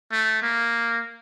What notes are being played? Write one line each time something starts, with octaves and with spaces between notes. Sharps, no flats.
A3
A#3